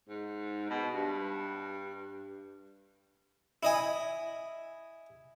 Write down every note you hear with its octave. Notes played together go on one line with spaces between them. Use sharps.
G#2
B2
G2
E4 D#5 G#5